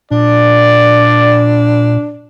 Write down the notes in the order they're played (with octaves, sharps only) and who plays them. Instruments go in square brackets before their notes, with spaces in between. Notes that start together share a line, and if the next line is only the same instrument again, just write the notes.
[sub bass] A#2 [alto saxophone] D4 [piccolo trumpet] D5